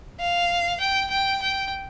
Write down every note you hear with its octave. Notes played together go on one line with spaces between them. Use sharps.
F5
G5
G5
G5